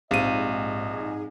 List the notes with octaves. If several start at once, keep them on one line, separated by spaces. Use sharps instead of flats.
A#1 G#2 C4 G4 D#5 F5 D#7